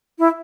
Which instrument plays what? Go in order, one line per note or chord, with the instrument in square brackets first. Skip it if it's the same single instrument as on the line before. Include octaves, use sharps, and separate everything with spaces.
[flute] E4